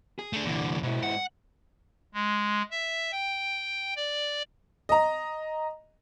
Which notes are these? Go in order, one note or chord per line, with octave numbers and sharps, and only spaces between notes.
G#4
A3 D4
C2 A#2 D3 E3
G#2 B2 E4
F#5
G#3
E5
G5
D5
D#5 A#5